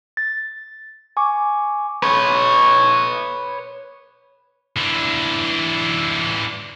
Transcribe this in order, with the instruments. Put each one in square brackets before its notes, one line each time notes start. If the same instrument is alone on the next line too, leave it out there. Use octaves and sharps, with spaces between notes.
[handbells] A6
G#5 C#6 D6
[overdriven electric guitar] B4 C#5
[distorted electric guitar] E3 D4